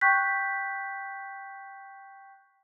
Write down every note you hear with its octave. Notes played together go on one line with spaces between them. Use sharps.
G5 C#6 F#6 G6 B6